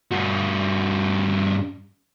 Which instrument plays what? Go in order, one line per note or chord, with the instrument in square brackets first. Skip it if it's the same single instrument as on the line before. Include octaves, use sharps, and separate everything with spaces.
[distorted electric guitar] G2 F#4